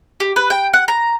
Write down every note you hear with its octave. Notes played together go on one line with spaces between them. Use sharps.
G4
B4
G5
F#5
A#5